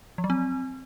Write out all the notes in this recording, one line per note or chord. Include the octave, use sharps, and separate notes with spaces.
F3
F#3
C4